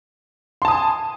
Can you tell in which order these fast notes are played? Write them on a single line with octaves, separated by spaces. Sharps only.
C6 A5 D#6 G#5